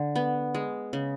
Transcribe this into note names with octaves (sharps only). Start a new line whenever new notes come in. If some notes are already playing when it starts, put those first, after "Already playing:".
Already playing: D3
B3
G#3
C#3